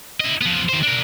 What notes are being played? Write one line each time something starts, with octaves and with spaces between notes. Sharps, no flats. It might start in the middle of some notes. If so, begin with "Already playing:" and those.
E4 D#5
F3 B3
D#3 C5
D4 A#4